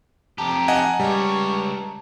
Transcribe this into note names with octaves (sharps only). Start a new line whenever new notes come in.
F2 G4 A5 A#5
D#5 F#5 G#5
C#2 G3 C#5